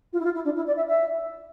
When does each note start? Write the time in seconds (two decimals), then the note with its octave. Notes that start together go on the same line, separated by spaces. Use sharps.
0.12 F4
0.19 E4
0.24 F4
0.34 E4
0.44 D4
0.55 E4
0.66 D5
0.76 E5
0.87 E5